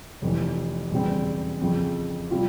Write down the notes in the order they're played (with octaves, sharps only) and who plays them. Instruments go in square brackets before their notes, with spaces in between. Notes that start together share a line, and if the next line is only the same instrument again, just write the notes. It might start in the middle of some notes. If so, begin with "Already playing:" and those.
[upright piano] F1 F2 E3
E1 E2 C#3 G3 C4
F2 C#3 F3 C4
C3 G3 C4 F4